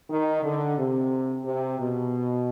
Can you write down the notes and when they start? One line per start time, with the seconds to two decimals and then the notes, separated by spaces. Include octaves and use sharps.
0.10 D#3
0.43 D3
0.78 C3
1.45 C3
1.80 B2